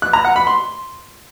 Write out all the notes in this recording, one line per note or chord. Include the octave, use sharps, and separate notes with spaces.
F#6
A#5
F#5
B5
C6